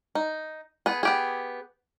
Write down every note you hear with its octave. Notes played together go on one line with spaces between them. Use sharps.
D#4
B3 G#4
B3 G4 G#4